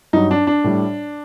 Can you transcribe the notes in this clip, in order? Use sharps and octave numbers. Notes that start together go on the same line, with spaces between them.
G2 F#3 D#4
D4
D4
A2 G3